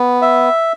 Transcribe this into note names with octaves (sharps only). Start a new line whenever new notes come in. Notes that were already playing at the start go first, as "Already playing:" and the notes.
Already playing: B3
E5